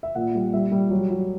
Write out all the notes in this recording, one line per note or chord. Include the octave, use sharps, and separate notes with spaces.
E5
A#2 F#5
G3
G3 E5
G3
F#3
F#3